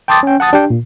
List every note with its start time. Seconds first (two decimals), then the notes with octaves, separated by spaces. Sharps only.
0.08 G5 A5 C6 D6 D#6 A6
0.23 C#4 G5
0.40 F#5 A5 D#6 A6
0.53 D4 G4 G5
0.70 A#2